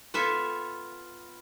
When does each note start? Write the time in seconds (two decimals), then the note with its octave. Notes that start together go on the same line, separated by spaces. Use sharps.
0.14 B3 F4 A4 E5 G#5